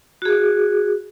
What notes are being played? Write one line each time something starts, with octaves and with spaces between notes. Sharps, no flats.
F#4 G#4